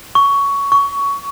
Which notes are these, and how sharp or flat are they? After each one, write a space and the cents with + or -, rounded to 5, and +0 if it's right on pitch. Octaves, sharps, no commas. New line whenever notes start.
C#6 +15
C#6 +20